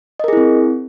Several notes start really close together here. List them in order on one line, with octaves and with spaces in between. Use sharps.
D#5 A#4 G#4 E4 C4